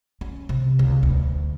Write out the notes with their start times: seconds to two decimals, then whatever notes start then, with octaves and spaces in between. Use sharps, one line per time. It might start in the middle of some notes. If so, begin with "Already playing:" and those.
0.21 C#4
0.49 C3
0.79 C#2
1.03 D2